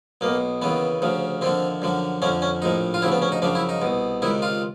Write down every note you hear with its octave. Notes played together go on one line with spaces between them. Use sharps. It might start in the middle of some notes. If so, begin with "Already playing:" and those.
B1 B2 A#3
D#2 C#3 E3 B3
D2 C#3 F3
D#2 D3 F3 C4
F#2 D3 F3
F2 D3 F3 C#4
C#4
A#1 A2 F3 D#4
F4
D2 C#3 F3 E4
B3
C#4
D#4
F#2 C#3 F3 D4
E4
D#4
C2 B2
C#2 C3 D#3 E4
F4